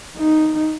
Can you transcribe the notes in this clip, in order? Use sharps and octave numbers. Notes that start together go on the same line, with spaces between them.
D#4